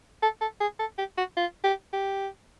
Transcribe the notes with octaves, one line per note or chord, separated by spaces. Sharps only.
A4
A4
G#4
A4
G4
F#4
F4
G4
G4